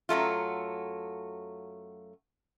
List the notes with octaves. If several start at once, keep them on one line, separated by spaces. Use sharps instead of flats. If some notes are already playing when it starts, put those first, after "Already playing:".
F#2 F#3 A3 F4